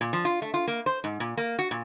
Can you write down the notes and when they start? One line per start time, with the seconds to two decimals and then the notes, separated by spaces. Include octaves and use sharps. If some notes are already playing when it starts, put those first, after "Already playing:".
0.01 A#2
0.13 F3
0.25 F4
0.42 A3
0.54 F4
0.68 A#3
0.86 C5
1.04 G#2
1.20 A#2
1.37 A#3
1.59 F#4
1.71 A#2